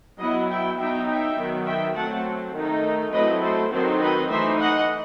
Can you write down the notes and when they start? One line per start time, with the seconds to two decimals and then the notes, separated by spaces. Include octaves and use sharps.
0.20 F#3 B3 E4 D#5 F#5
0.50 E5 G5
0.78 F#3 B3 D#4 E5 G5
1.08 E5 G5
1.38 D#3 F#3 B3
1.66 E5 G5
1.96 F#3 A3 C4 F#5 A5
2.54 D#3 A3 D#4
3.13 F#3 A3 C4 E4 B4 D#5
3.42 A4 C5
3.72 D#3 F#3 C4 D#4 A4 C5
4.01 B4 D#5
4.30 E3 A3 D#4 C5 E5
4.60 D#5 F#5